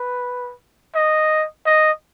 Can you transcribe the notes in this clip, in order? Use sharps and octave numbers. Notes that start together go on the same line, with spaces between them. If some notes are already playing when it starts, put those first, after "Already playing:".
Already playing: B4
D#5
D#5